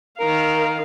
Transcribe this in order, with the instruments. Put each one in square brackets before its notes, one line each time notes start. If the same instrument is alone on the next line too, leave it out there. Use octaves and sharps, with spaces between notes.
[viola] D#3 F5 [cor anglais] A#4